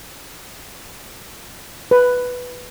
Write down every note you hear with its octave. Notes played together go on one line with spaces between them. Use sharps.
B4